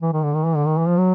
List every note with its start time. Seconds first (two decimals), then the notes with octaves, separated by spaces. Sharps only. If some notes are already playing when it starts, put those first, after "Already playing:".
0.02 E3
0.13 D#3
0.24 D3
0.35 D#3
0.46 E3
0.56 D3
0.66 D#3
0.78 E3
0.88 F3
0.98 F#3